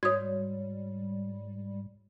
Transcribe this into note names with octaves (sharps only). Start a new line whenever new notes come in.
G#2 G3 F#4 C#5 D#6 G#6